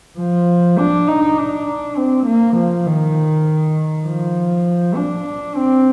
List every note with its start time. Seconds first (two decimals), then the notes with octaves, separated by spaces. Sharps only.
0.19 F3
0.79 D4
1.08 D#4
1.38 D4
1.97 C4
2.26 A#3
2.57 F3
2.87 D#3
4.06 F3
4.96 D4
5.55 C4